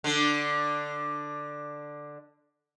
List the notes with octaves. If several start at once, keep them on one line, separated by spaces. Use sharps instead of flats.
D3 D4